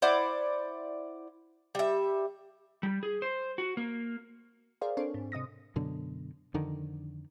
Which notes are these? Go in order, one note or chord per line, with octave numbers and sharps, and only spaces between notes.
E4 C5 D5 F#5
G3 E5
G3
G#4
C5
F#4
A#3
G#4 A#4 C5 D5 F5
C4 D4 A4 C5 C#5
G#2
C3 D#5 D#6 A#6
F#2 B2 D3
F2 D3 D#3